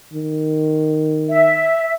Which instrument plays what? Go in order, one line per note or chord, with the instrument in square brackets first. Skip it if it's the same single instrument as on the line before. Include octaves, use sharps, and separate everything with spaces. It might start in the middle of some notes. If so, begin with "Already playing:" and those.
[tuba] D#3
[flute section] E5